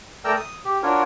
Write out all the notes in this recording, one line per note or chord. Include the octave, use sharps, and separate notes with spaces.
A3 A#4 D5 G5 A#5 E6
D#6
G4
D4 F4 F#4 A#4 C#5